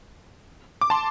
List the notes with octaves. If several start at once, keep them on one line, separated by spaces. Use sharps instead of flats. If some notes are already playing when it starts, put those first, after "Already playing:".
D6
A5 C6